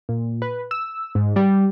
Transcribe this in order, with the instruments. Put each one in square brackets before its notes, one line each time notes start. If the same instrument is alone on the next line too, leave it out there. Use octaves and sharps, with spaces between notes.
[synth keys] A#2
B4
E6
G#2
G3